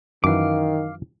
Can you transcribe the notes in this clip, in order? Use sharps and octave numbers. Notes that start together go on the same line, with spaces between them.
F#2 D#3 E3 F5 D6